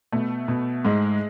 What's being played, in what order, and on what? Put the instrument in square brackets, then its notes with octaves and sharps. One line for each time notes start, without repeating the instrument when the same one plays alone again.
[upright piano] B2 [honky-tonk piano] A3
[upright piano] B2
[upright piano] G#2 [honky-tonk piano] G#3